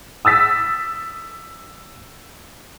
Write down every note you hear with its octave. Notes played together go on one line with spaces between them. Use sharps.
D#6 E6 A6 B6